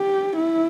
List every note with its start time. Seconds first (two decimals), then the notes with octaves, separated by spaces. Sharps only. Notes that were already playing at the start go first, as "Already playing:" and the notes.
Already playing: G4
0.37 E4